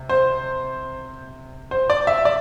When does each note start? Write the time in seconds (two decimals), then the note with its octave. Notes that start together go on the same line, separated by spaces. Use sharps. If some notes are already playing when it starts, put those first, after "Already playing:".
Already playing: C3
0.09 C5
1.71 C5
1.90 D5
2.07 E5
2.25 D5